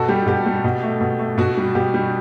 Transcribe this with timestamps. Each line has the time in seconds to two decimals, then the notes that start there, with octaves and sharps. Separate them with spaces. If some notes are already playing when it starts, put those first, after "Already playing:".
Already playing: B2 F#4 A4
0.08 G3 G4
0.27 B2 G4
0.46 G3
0.64 B2
0.83 A3
1.01 B2
1.19 A3
1.38 B2 F#4
1.57 G3
1.75 B2 G4
1.94 G3